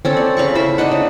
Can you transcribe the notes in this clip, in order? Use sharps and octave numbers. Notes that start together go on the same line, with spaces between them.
C4 C#4 A4
D5
C#3 F5 B5 C#6
E4 C5 E5
D4 D#4 D#5 F#5
C#3